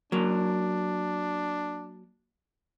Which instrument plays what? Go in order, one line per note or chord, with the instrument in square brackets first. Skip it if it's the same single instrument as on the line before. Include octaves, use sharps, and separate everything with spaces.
[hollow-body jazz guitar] F#3 A#3 [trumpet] D4